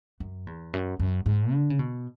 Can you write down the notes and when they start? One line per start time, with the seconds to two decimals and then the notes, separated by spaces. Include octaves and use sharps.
0.20 F#2
0.47 E2
0.73 F#2
1.00 F#2
1.26 G#2
1.53 D3
1.70 C#3
1.79 B2